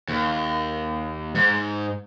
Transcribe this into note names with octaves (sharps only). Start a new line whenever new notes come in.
D#2
G#2